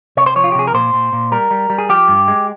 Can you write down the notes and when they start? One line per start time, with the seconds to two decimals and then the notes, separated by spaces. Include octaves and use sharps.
0.17 C3 C#5
0.26 C5
0.36 F3 C#5
0.44 F4
0.52 G4
0.55 C3 G#4
0.67 A#4
0.74 A#2 C5
0.94 A#2
1.13 A#2
1.32 G3 A#4
1.51 G3
1.70 G3
1.78 G#4
1.89 F3 G4
2.08 G2
2.28 G#3